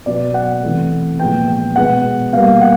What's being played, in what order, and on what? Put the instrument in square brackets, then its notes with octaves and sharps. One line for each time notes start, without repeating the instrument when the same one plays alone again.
[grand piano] B2 F#3 B3 D5
F#5
C3 E3 A3
A#2 F3 G#3 B3 G5
G5
B2 G#3 B3 F#5
B2 G3 A#3 F5
F#5